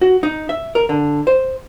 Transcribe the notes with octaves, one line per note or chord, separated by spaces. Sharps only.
F#4
D#4
E5
A#4
D3
C5